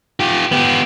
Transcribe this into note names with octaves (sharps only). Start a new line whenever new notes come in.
F4 G4
B3 G4